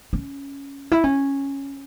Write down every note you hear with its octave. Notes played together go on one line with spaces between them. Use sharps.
C#4
E4
C#4